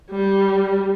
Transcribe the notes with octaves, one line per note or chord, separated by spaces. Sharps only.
G3